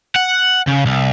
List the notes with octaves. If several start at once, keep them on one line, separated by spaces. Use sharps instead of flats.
F#5
C#3
C2